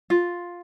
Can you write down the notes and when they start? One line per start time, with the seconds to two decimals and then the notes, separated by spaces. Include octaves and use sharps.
0.10 F4